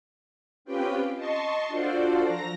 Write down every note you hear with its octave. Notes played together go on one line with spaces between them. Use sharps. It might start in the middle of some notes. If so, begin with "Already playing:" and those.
C4 C#4 F4 G4 B4 G5
D#5 A5 C6 C#6
D4 F4 F#4 A4 C5 D5
F3 A#5 A#6